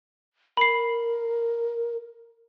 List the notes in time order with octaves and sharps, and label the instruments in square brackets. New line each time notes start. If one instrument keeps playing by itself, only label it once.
[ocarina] A#4 [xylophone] B5 C7